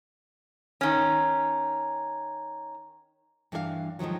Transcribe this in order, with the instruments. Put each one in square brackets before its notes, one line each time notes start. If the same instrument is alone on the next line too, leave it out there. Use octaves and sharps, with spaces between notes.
[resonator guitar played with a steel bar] D#3 C#4
[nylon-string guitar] G2 E3 D4 G#4 F5
F2 G#2 D#3 F3 F#3